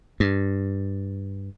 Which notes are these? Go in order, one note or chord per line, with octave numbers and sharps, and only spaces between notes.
G2